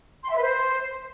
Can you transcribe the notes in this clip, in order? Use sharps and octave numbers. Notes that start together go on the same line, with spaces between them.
C6
E5
B4
C5